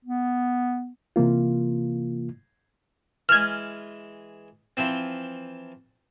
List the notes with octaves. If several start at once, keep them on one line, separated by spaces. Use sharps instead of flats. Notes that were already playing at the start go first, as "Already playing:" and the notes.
B3
C3 E3 A#3 F4
E3 G#3 F6 G#6
E3 F3 C4